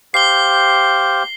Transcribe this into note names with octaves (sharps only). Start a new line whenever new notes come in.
G4 C5 F5 C7 G7